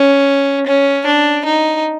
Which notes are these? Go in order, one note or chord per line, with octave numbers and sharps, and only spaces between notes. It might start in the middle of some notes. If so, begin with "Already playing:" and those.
Already playing: C#4
C#4
D4
D#4